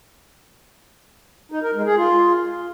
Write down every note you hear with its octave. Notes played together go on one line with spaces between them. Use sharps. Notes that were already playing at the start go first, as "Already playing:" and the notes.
D#4
A#4
G#3
G#4
F4